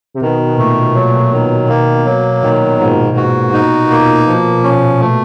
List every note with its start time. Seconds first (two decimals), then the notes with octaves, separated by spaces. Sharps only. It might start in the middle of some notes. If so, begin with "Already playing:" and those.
0.14 C3
0.21 B2 D#3
0.46 B2
0.58 A#2 A3
0.95 B2 F#3
1.04 A#2
1.13 B2
1.32 D#3
1.69 A#3
2.06 F#3
2.42 A#2 D#3
2.79 G#2
3.17 F#4
3.53 D#4
3.90 A#3
4.27 F3
4.64 C#4
5.01 A3